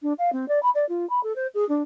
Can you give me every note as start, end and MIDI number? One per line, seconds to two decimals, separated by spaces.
0.02 0.13 62
0.18 0.30 77
0.32 0.48 60
0.48 0.61 74
0.63 0.70 83
0.75 0.87 74
0.89 1.08 65
1.10 1.22 83
1.23 1.35 69
1.36 1.47 72
1.54 1.67 68
1.69 1.82 62